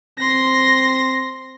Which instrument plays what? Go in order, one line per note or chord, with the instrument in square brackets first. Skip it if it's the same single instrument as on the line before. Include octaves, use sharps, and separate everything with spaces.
[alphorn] C4 [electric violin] C6 A#6